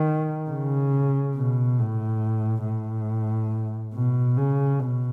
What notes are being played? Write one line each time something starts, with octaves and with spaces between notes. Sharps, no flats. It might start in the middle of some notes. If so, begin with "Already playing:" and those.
Already playing: D#3
C#3
B2
A2
A2
B2
C#3
B2